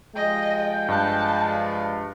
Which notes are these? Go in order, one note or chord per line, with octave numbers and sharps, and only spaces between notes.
F3 G3 G#3 D#5 G5
G2 A5 F#6